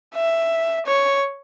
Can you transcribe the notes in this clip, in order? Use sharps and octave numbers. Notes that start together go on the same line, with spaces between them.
E5
C#5